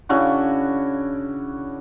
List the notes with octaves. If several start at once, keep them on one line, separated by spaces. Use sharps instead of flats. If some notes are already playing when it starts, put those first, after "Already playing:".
C#3 D4 E4 F#4